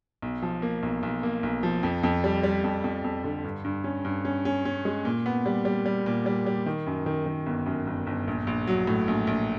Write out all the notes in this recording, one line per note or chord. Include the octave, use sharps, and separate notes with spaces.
B1
F3
A#3
B1
B1
A#3
B1
F3
F2
F2
G3
G3
F2
F2
F2
D3
G2
G2
C#4
G2
C#4
C#4
C#4
G#3
A#2
B3
G3
G3
G3
A#2
G3
G3
D#3
F#2
D#3
D#3
G1
F#2
G1
G1
A#1
A#1
F#3
A2
A#1
A#1